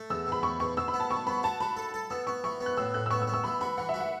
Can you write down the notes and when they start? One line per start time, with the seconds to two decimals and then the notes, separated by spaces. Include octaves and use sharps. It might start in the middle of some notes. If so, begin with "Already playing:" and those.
Already playing: A3
0.10 E2 E6
0.26 B2
0.32 B5
0.43 E2 C#6
0.60 B2 C#6
0.77 B2 E6
0.88 B5
0.94 B3
1.00 A5
1.10 B2 C#6
1.27 B3 B5
1.43 F#4 A5
1.60 F#4 B5
1.77 A4
1.94 A4
2.10 B3 E6
2.27 B3 C#6
2.44 E3 C#6
2.61 B3
2.66 F#6
2.77 A2 E6
2.94 A2 F#6
3.06 E6
3.11 B3 C#6
3.22 E6
3.27 B3
3.34 E6
3.44 E3 B5
3.61 F#4 B5
3.78 E3 F#5
3.89 E5
3.94 F#4
4.00 F#5